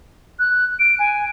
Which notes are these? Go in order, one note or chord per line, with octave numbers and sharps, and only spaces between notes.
F#6
D7
G#5